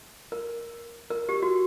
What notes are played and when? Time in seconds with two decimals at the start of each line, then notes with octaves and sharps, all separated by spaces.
0.32 A#4
1.10 A#4
1.29 G4
1.43 F#4